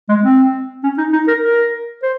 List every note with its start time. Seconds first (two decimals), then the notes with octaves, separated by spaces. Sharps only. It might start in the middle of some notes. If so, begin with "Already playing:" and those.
0.09 G#3
0.24 C4
0.84 C#4
0.98 D#4
1.13 D#4
1.28 A#4
1.43 A#4
2.03 C5